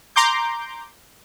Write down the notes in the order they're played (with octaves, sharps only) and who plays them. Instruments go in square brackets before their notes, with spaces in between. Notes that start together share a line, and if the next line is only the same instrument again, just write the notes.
[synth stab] A#5 C6 D6 G6